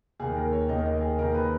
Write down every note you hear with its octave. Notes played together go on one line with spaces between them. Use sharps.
D#2 D#3 G#4
A#4
C#5
D#2 D#3 D#5
D#5
G#4
D#2 D#3 A#4
B4